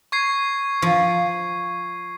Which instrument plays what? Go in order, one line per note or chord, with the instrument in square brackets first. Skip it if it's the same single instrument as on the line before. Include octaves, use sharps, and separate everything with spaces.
[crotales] C#6 G#6 C7
[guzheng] F3